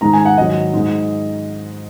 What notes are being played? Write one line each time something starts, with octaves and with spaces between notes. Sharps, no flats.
G#2 D#3 G#3 A#5
G#5
F#5
G#2 D#3 F#3 D#5
G#2 G#3